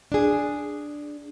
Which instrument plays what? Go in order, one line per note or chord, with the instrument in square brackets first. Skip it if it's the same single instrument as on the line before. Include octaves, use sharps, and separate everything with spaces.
[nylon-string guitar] D4 G#4